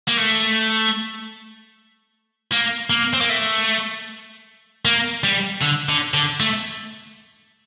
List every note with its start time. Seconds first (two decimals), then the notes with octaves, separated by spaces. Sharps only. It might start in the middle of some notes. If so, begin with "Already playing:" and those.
0.08 A#3
0.18 A3
2.52 A#3
2.90 A#3
3.13 C4
3.21 A#3
3.30 A3
4.85 A#3
5.24 G3
5.62 D3
5.89 D3
6.14 D3
6.40 A3